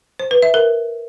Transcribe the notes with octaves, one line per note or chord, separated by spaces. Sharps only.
C5
B4
E5
A#4